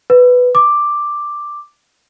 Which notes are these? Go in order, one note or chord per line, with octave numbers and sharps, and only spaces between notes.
B4
D6